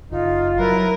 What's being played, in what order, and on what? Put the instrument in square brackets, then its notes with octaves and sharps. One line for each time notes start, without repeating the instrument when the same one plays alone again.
[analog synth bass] F#1 [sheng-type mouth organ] D#4 [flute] F4
[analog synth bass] F#3 [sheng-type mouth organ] E4 B4 [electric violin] A#4